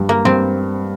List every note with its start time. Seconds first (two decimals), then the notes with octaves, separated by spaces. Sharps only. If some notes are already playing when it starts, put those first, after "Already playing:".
Already playing: G2 G3
0.09 A#3
0.25 G2 C4